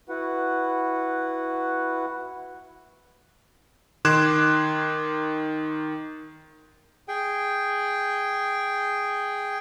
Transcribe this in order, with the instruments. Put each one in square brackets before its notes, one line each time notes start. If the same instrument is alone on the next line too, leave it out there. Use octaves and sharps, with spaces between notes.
[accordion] E4 F#4 B4 F#5
[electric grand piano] D#3 C6 D6 F#6 G#6 E7
[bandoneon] G#4 G5